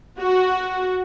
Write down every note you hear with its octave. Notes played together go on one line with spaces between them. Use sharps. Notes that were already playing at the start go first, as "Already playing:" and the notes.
F#4